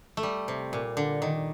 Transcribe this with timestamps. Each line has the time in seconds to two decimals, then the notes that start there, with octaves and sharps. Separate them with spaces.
0.17 A3
0.23 G3
0.48 C3
0.73 A#2
0.97 D3
1.22 D#3